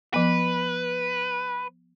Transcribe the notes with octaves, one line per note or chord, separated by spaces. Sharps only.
F3 B3 B4